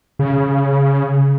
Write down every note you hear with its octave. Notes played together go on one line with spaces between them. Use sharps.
C#3